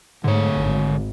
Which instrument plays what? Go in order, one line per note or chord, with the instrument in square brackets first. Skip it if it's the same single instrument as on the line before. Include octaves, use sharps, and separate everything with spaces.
[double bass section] G#2 A3 [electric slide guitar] D3 C#5
[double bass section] G#1